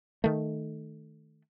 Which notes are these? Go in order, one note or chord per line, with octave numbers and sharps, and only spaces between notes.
D#3 A3